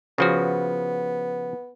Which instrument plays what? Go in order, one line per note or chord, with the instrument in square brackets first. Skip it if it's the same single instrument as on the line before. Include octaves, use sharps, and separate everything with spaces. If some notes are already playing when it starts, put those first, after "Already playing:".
[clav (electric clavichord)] C#3 F3 F#4 [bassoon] B3